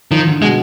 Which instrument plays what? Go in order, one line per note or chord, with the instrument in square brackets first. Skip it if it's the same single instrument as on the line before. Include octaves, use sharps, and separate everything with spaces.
[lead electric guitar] D#3 [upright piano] F3
[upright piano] D3
[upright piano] B2 [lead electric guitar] G#3